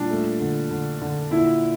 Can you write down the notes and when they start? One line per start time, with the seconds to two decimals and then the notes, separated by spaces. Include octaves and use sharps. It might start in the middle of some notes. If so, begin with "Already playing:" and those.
Already playing: A#2 G3 D4
0.10 A3
0.40 D3
0.71 D3
1.01 D3
1.31 A#2 E4